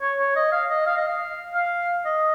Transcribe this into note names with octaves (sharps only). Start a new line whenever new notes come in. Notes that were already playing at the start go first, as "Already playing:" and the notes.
C#5
C#5
D#5
F5
D#5
F5
D#5
F5
F5
D#5